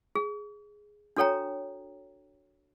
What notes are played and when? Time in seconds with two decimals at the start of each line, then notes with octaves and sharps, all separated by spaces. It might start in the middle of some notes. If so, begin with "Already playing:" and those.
0.15 G#4
1.16 D4 F#4 A4 C#5 G5 A#5